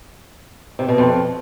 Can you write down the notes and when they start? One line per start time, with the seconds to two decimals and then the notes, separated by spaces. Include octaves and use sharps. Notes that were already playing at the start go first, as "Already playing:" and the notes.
0.79 C3
0.88 B2
0.98 F2